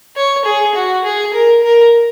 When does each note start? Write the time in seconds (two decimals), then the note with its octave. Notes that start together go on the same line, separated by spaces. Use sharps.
0.16 C#5
0.45 G#4
0.75 F#4
1.04 G#4
1.33 A#4
1.62 A#4